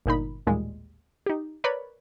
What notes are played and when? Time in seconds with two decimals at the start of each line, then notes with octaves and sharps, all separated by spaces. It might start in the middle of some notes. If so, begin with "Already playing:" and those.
0.06 G1 A#2 D#4 B5
0.47 A1 D#2 A#2 G3 G#3
1.26 D#4 G4
1.64 A#4 B4 C#5 D5 B5